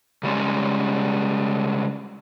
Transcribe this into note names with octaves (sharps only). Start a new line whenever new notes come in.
C#3 G3 G#3 C#4